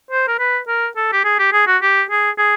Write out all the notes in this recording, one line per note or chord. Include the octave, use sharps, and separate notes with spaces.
C5
A#4
B4
A#4
A4
G4
G#4
G4
G#4
F#4
G4
G#4
G#4